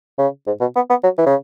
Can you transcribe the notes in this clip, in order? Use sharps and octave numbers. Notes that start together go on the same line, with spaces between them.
C#3
G#2
B2
B3
B3
F#3
E3
C#3